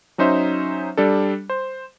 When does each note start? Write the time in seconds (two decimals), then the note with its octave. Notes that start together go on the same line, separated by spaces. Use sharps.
0.18 F#3 C#4 D#4 C5 E5
0.97 G3 D4 A4
1.50 C5